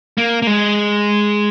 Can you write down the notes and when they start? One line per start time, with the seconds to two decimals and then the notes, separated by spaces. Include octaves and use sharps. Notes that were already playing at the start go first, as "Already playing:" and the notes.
0.18 A#3
0.42 A#3
0.47 G#3